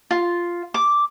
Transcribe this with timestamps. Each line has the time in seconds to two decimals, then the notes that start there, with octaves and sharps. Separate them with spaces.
0.11 F4
0.74 D6